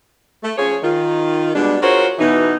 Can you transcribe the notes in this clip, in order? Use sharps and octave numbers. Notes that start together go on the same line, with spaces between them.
A3
F3 C#4 G#4 C#5
D#3 F4
B2 G3 G#3 D4
F4 F#4 G#4 A#4 C5 C#5
B2 E3 D#4